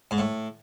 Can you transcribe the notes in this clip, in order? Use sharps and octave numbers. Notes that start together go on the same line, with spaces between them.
G#2
A2